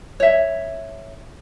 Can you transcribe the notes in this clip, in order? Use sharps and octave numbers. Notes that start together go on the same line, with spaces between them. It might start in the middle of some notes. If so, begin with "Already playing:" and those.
C#5 E5